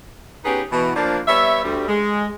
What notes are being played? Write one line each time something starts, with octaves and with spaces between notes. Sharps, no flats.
B3 C#4 D#4 G4 G#4 B4
B2 E3
F3 A#3 D4
G3 B3 C#5 E5
D2 G3
G#3